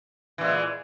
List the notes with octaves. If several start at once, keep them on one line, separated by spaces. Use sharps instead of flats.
A#2 E3 G#3